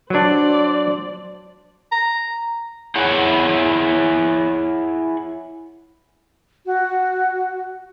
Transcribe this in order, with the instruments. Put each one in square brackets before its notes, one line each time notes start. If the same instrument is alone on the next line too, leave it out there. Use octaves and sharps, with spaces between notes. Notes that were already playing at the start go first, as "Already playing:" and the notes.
[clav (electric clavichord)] F#3 D4 [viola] C5 D5
[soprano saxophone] A#5
[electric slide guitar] E4 G#4 C#5 F#5
[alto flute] F#4